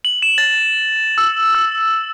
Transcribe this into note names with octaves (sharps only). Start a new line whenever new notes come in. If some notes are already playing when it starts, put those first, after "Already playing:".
F#7
E7
A6
E6
E6